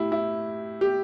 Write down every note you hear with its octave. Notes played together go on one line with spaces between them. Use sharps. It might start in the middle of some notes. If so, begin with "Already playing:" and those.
Already playing: A2 E4 G4
E4
G4